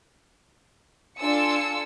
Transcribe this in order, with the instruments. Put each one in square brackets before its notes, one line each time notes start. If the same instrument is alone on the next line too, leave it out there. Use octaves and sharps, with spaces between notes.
[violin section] D4 F4 A4 G#5 E6 C#7